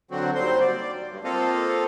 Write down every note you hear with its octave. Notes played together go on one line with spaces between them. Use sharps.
D3 F#3 C4 F#4
D#2 F#3 G3 C4 C5 C6
D5
G2
A#3 C4 F4 A4 D#5 F5